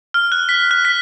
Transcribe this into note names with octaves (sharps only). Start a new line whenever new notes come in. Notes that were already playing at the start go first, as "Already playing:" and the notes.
F6
F#6
B6
F#6
B6